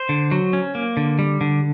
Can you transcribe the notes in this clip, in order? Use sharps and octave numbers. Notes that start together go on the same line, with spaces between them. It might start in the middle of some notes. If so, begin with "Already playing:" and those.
Already playing: C5
D3
F#3
C#4
A#3
D3
G3
D3